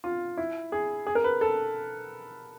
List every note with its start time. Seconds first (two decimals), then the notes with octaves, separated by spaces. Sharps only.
0.04 F4
0.37 E4
0.72 G#4
1.07 G#4
1.15 A#4
1.24 B4
1.41 A4